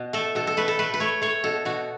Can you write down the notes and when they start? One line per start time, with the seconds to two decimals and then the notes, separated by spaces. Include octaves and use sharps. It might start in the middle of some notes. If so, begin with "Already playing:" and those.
Already playing: B2
0.13 A3 A4
0.35 B2 A4
0.47 A4
0.57 A3 B4
0.68 A4
0.79 A3 B4
0.94 B4
1.00 A3 C#5
1.22 A3 C#5
1.44 B2 A4
1.65 B2 F#4